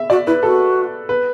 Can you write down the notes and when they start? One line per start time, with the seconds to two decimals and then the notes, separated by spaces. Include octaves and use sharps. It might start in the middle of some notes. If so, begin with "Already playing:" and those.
Already playing: E5
0.10 F#4 D5
0.27 E4 B4
0.43 F#4 A4
1.09 B4